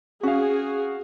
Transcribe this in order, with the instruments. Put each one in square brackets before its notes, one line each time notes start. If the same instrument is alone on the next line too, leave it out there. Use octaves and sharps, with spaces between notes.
[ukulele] C#4 [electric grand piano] F#4 F5 [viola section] G#4